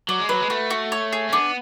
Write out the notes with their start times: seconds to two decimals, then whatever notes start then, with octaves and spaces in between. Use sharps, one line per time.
0.09 F#3 D5
0.19 G#3
0.29 F#3 B4
0.40 G#3
0.50 A3 F#4
0.70 F#4
0.92 C#5
1.12 G#4
1.29 C#4
1.33 B3 D4